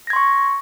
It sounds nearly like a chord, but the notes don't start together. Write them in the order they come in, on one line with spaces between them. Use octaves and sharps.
A#6 G#6 C6 C#6